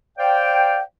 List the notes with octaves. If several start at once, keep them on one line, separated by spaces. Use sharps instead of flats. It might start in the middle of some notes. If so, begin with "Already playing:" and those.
C5 D5 F5 G5